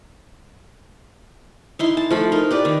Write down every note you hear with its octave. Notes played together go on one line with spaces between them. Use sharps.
D#4 E4 C6
A5
F3 A3 B5
D#4 A#4
G4 B4 D5
D#3